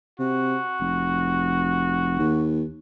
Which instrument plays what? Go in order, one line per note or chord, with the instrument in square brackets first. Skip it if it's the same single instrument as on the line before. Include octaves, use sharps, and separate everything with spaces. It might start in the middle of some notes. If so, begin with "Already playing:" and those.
[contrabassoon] C3 [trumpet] F#4
[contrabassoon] F1
D#2